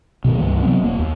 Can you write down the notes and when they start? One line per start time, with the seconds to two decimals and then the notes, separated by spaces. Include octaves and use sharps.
0.25 B2 D3 D#3
0.38 C#2 G2 E3 A#3
0.62 C3 F#3 B3 C4
0.84 D#1 A#3
0.99 D#2